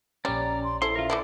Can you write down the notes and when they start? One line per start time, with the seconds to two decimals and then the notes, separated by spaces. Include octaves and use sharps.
0.25 A#1 G3 C#4 D5 A#5
0.64 C6
0.82 E4 A4 C5 C6
0.96 F4 A#4 E5
1.10 E3 A3 E4 D5